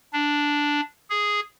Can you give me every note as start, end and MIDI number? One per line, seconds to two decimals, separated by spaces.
0.13 0.81 62
1.10 1.40 68